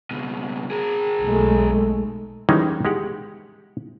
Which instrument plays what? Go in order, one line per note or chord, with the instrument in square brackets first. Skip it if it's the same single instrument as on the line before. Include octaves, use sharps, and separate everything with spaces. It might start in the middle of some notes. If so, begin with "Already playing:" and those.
[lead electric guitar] C#2 B2
G#4 A#4
[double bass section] B1 G#3 A3
[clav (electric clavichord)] D#3 E3 G3 G#3 C#4 D#4
G#3 G4 F#5